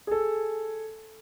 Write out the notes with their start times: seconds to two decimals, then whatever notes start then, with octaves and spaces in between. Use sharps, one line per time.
0.07 G#4 A4